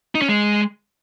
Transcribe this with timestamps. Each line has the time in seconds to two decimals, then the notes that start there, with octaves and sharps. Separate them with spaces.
0.15 D#4
0.22 C#4
0.29 G#3